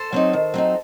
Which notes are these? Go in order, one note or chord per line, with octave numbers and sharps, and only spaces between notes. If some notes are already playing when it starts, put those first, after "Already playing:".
Already playing: A4 C5
F#3 C4 D#4
D#3
F#3 C4 D#4